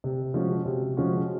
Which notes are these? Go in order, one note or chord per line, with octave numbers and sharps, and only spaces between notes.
C3
F3 G#3 C#4 F#4
C3
F3 G#3 C#4 F#4